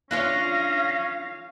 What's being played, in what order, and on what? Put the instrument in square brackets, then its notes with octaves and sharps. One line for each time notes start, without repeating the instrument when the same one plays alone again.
[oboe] C#4 [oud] D4 F4 C#5 [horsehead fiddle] F5 [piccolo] A#6